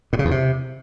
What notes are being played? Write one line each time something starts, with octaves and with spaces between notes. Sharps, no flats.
A2
C#3
E2
C3